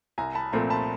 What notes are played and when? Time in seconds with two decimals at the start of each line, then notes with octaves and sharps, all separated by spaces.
0.18 C2 G#5 A#5
0.35 A5 B5
0.53 A#2 F3 A3 C4 A#5 C6
0.70 A5 B5